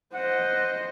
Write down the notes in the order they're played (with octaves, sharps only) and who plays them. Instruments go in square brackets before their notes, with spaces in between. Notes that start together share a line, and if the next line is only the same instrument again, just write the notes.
[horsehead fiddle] C5 D#5 [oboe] F#5